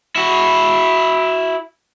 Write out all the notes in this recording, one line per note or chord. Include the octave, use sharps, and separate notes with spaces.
E4 F#4